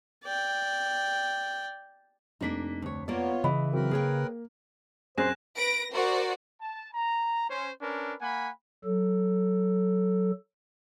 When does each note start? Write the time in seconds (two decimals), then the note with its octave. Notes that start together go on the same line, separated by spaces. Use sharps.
0.25 D5 G5
2.41 F1 A#3 D4 D#4 B6
2.82 D2 C#5
3.08 A#3 B3 F4 C#5 D5
3.44 C#3 E3 D#5 B5
3.73 F#3 C4 A#4 B4
3.91 A#3 G#4 C#5 G5
5.18 F#2 C4 G#4 C5 F#6 A#6 E7
5.55 B4 A#6 D7
5.93 F#4 A#4 C5 D5
6.61 A5
6.94 A#5
7.50 C#4 C5
7.81 C#4 D4 A#4 B4
8.21 A#3 F#5 G#5 B5
8.84 F#3 A4